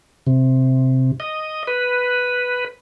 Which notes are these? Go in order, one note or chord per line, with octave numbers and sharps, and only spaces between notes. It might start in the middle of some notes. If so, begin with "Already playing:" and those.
C3
D#5
B4